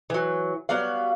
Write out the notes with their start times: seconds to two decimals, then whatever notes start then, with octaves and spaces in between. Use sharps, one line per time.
0.10 E3 F#3
0.69 F#3 G3 B3 F5